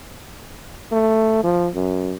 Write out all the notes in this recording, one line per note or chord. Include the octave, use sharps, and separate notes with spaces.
A3
F3
F#2